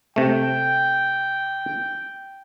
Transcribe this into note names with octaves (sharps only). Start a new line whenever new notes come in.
C3 A3 G5